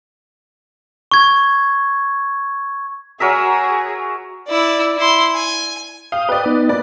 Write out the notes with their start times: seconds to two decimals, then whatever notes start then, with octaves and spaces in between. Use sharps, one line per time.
1.12 C#6 G#6
3.20 F#3 G#4 A#4 E5
4.48 E4 D5
4.98 E4 C6
5.35 G#5
6.12 F5 G5 D#6
6.29 B4 D5
6.46 B3 D#4
6.69 A#3 B4 D5